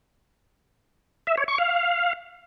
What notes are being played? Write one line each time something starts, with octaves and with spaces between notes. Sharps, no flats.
E5
C#5
C#6
F5